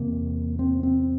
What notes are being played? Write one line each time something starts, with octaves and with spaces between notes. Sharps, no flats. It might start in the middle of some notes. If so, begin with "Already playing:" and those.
Already playing: E2 C3 A#3
C4
C4